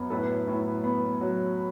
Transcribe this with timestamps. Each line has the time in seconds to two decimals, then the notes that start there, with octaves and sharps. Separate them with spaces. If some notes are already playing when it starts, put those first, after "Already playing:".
Already playing: F#2 B3
0.10 A2 A4 B4
0.47 A2
0.84 B3
1.21 F#3